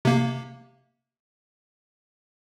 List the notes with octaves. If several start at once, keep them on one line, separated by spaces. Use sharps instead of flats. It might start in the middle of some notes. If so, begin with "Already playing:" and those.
C3 A#3